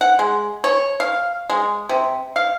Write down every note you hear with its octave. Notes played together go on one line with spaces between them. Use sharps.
F#5
G#3
C#5
F5
G#3
C3
F5